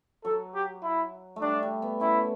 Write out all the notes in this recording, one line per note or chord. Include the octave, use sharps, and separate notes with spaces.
F#3 A4
G4
E4
A3
G3 D4
G3
B3
C#4 E4